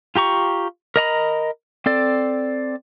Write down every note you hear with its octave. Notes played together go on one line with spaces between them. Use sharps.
F4 G4 A#5 C#6
A#4 D#5 A#5 B5
C4 A4 D5